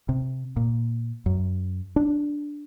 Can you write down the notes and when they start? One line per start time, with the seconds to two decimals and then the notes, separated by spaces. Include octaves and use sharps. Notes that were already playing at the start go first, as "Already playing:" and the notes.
0.09 C3
0.57 A#2
1.26 F#2
1.96 D4